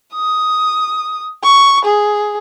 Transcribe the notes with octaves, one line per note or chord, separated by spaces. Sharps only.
D#6
C#6
G#4